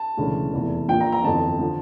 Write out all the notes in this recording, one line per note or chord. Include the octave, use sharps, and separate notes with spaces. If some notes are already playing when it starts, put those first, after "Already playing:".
Already playing: A5
E1 D2 C#3 E3
F1 E2 E3
A#1 A#2 F3 G5
A#5
A#5
G1 F2 E3 A5
D3 F3